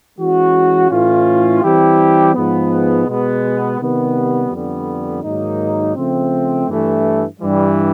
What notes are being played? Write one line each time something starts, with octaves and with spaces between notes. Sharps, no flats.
E3 G#3 C#4 F#4
A2 E3 A3 C#4 F4
E3 G3 C4 E4 G4
G#2 F3 G#3 B3
B2 G#3 B3
C3 D#3 G3 B3
F2 D3 G3 B3
G#2 D#3 F#3 A#3 D#4
C#3 F3 A3 C4
G2 E3 A3
G2 E3 G3